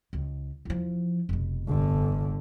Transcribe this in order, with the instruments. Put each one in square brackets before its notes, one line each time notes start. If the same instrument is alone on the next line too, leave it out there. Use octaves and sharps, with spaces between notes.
[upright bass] C#2
E2 F3
F1 B2
[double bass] G1 D3